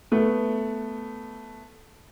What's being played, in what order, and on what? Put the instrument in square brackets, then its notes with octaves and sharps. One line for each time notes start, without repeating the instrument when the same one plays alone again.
[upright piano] A3 B3